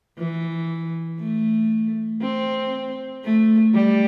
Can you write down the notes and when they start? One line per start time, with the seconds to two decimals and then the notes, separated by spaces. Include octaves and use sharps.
0.18 E3
1.19 A3
2.21 C4
3.24 A3
3.74 G3